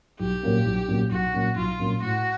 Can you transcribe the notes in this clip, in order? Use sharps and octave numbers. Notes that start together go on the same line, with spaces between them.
B1 G4
A#2 F#3 A#3 C#4
B1
A#2 F#3 A#3 C#4
B1 F#4
A#2 F#3 A#3 C#4
B1 F4
A#2 F#3 A#3 C#4
A2 F#4